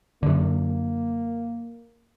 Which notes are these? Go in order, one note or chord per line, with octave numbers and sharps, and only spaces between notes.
F#2 D3 A#3